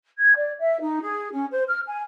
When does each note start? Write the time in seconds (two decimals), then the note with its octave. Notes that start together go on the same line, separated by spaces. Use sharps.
0.18 G#6
0.35 D5
0.59 E5
0.80 D#4
1.02 G#4
1.32 C#4
1.51 C5
1.67 F6
1.86 G#5